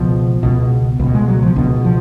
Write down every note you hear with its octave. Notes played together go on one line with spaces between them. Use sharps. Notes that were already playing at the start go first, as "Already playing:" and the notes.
Already playing: C#2 B2 F3
C#2 B2
C#2 B2
G#3
F#3
F3
C#2 B2 D3
F3